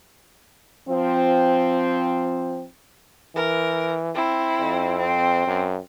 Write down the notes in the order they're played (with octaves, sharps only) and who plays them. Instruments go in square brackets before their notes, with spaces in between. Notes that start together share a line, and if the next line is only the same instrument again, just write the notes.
[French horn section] F3 C4
[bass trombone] E3 [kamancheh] A#4
[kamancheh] C4 E4
[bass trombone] F2
[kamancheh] C4
[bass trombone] F#2